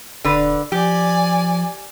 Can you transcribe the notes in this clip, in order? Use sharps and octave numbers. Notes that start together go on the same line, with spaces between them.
D#1 D3 B4
F3 G4 D5 G#5